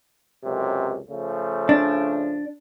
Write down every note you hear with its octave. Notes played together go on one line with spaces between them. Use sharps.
C#2 F#2 C3
C#3 F3 A3
D4